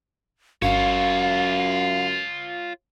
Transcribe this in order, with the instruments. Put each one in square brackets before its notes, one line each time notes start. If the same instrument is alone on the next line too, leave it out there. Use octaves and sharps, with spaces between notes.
[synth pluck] G1 [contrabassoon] F#2 [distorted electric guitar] F4 C#5 [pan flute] F5